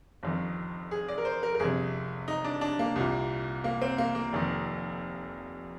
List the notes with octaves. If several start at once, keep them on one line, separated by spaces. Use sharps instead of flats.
G1 F2 D#3
G#4
D5
A#4
C5
A#4
A#4
G1 F2 C3 G#4
D#4
D4
D4
A#3
C2 A#2
A#3
C4
A#3
A#3
F1 F2 D#3